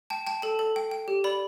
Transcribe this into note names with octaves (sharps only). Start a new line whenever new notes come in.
G5 A5
G5 A5
A4 A5
A4
G5
G5
G4
D5 B5